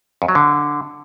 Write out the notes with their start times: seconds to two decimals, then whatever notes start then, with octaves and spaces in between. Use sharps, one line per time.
0.22 F2
0.28 F#3
0.35 D3